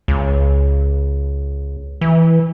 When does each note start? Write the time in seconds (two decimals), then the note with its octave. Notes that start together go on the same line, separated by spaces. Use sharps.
0.08 C#2
2.01 E3